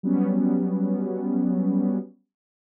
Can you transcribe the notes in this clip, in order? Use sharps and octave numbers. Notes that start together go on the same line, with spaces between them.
F#3 G3 B3 C#4